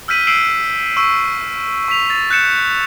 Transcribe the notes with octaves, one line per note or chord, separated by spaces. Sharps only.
E6 F6 G6 B6 D#7 F#7
E6 C7 D7 E7 F#7
C#6 E6 D#7
C#6 B6 F7
A6
F#6 G6 C#7 E7